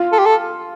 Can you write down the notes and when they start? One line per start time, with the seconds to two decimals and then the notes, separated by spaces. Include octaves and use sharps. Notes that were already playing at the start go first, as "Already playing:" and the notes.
Already playing: F4
0.12 A4
0.19 G4
0.26 A4